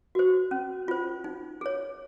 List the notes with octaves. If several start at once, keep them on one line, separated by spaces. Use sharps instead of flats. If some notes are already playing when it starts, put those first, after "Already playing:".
F#4 C5
C#4
F4 C5
D#4
G#4 C#5